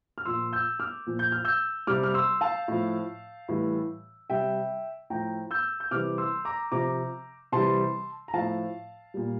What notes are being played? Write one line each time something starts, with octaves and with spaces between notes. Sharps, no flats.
F6
A#2 F3 C6 E6
E6 G6
D6 F6
A#2 F3
G6
F6
E6 G6
C3 G3 D6 F6
F6
C6 E6
F5 A5
A2 F3
A2 E3 G3
C3 G3 E5 G5
A2 F3 G5 A#5
E6 G6
G6
C3 E3 G3 D6 F6
C6 E6
A#5 D6
C3 F3 A#5 D6
C3 E3 G3 A5 C6
A#5
A2 F3 F5 A5
A#2 G3